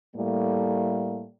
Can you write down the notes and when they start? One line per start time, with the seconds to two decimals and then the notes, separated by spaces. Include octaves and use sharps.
0.15 A2 G3 A3 A#3